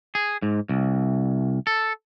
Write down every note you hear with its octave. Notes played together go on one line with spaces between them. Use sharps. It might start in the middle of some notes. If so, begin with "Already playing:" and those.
G#4
G#2
C2
A4